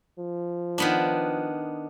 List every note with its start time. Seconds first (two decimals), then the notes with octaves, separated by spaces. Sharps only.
0.18 F3
0.78 D#3 B3 D4